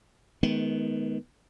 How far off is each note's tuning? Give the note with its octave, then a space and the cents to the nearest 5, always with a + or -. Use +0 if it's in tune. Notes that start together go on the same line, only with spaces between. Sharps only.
D#3 +15 G#3 +40 B3 +0